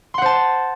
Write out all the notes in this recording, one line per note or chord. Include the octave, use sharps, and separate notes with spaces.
C5 F#5 A5 C6